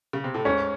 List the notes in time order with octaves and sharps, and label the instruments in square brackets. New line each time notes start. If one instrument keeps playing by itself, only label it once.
[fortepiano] C#3
C3
A2
[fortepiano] G#2 [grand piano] C#4